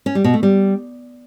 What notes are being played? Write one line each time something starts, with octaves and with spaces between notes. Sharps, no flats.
C#4
G3
B2
A3
G3